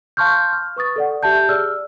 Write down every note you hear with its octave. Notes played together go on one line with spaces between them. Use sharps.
F5 A5 C6 C#6 F6 G6
F6
B4 C#6 D#6 A6
A4 D5 F#5
G4 E5 A5 G6
G#4 D5 E6 F6